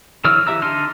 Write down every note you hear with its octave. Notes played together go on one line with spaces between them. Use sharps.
D3 E3 F#3 E6 F6
E3 G4 E5 A#5 E6
D3 D4 D#4 C6 F6